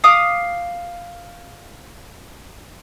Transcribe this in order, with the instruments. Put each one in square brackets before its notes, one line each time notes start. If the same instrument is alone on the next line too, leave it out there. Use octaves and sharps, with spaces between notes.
[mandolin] F5 D6 D#6